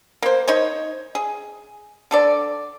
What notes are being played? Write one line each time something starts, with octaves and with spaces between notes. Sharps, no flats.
A#3 C5
D#4 C5 C#5
G#4
D3 A4 D5